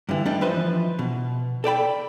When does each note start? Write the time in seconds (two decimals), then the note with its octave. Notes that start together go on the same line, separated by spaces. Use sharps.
0.09 G2 D3 E3
0.26 G3 A3 D4 D#4
0.41 E3 F3 B4 C5 D#5
0.99 B2
1.64 A4 D5 G5 B5